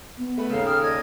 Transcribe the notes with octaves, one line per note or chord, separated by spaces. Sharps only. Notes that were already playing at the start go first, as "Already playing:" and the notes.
B3
A3 B4
D#2 C#3 A4 F5
G5 D#6 F6
D5 D#5 G#6